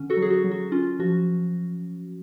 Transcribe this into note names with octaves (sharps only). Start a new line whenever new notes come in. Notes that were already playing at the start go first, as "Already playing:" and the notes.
Already playing: D3 C#4
F#4 A4
F#3
G#4
F#4
F#3
F#4
C#4 F4
F3 F#4